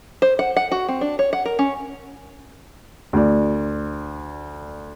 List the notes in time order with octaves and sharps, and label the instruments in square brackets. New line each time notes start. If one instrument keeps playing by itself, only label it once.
[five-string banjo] C5
F#5
F#5
F#4
C4
D4
C#5
F#5
A#4
C#4
[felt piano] D2 D5